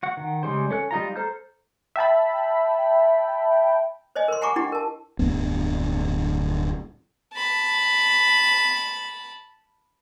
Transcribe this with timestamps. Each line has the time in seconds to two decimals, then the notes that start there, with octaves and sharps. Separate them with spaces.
0.03 F#4 F#5
0.17 D#3 F#5
0.43 C#3 G3 G#3 C5
0.70 C#4 A4 F#6
0.91 G3 D#4 F4 A#5
1.16 A4 C5 A#5 F6 G6
1.96 E5 G5 A5 B5
4.15 C5 C#5 D#5 G#5
4.28 A#4 C5 C6
4.41 F#5 G#5 A#5 B5 C#6 D6
4.56 D4 E4 G4 F#5 G5 B5
4.72 A#4 A5
5.19 D1 G2 B3
7.35 A5 B5